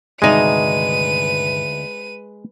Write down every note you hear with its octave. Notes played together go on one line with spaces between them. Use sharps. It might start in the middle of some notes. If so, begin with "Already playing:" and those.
D2 G2 C3 D#3 G#3 D#4 B4 D#7